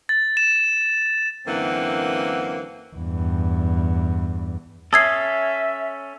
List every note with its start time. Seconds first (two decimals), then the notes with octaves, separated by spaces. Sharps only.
0.09 A6
0.37 E7
1.47 F#2 D3 E3 A#3 C4 F#5
2.97 E2 G2
4.93 C#4 A4 E5 D#6 G#6 C7